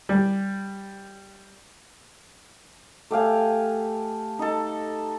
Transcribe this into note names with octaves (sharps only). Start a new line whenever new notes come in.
G3
A3 G4 F5 G#5
D#4 A4